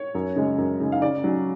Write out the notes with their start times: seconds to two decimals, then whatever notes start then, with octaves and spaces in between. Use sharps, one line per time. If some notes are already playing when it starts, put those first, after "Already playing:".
Already playing: C#5
0.15 F#2
0.36 C#3 G#3
0.58 F#2
0.80 C#3 G#3
0.92 F5
1.02 C#3 D5
1.24 F#3 C#4